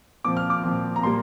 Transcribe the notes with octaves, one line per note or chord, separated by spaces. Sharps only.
A#2 F3 C4 D6
F6
D6
A#2 F3 C4
A#5
A#2 G3 A#3 C6